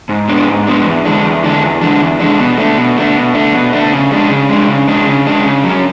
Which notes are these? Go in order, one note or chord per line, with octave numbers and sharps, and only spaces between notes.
G#2
G#3 B3 D4
G#2
G#3 B3 D4
E2
D3 G#3 D4
E2
D3 G#3 D4
E2
D3 G#3 D4
E2
D3 G#3 D4
B2
A3 D4
B2
A3 D4
B2
A3 D4
B2
A3 D4
C#3
G#3 D4
C#3
G#3 D4
C#3
G#3 D4
C#3
G#3 D4
C#3
F#3 C#4